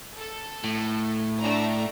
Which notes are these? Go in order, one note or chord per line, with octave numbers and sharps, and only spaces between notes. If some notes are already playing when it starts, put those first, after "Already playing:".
A4
A2
A3 D4 A#5